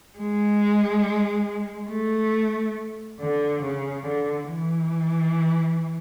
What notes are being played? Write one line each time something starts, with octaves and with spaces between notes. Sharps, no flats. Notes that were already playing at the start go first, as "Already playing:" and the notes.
G#3
A3
D3
C#3
D3
E3